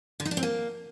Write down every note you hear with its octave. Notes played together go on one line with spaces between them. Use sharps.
D3
D#4
D4
C4
A#3